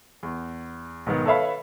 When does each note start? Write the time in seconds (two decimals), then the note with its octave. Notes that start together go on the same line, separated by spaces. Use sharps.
0.23 E2
1.06 B1 G#2 D#3 B3
1.26 A4 B4 C#5 E5 F5 B5